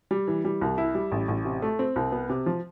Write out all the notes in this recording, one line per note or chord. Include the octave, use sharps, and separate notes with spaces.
G3
E3
G3
C2
E4
G3
A1
A1
C3
A3
C4
C2
B3
C3
F3